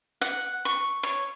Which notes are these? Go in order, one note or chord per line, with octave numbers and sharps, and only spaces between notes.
F#5
C#6
C#5